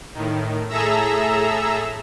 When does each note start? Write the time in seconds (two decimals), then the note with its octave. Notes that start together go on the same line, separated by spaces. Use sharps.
0.14 A2 D#3
0.69 A2 G#4 A4 E5 A#5 E6